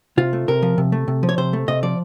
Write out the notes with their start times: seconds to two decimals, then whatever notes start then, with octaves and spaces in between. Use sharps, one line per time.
0.17 C3 F4
0.33 A3
0.48 C3 A#4
0.62 F3
0.78 C3
0.92 A3
1.08 C3
1.23 F3
1.29 C#5
1.38 C3 C5
1.53 A3
1.68 C3 D#5
1.83 F3 D5